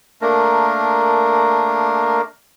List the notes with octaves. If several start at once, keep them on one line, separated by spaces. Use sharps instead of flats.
A3 A#3 D4 A#4